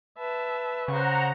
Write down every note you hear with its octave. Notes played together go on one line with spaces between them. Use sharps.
B4 E5 A5
C#3 C5 F#5 A#5 C#6